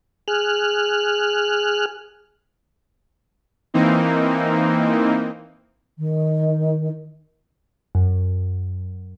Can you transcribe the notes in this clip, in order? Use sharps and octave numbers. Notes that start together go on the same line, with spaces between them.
G#4 F6 F#6
E3 A#3 C4 D#4
D#3
F#2